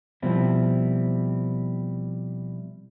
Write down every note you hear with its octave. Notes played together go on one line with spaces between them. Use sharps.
B2 F3 G3 C4 E4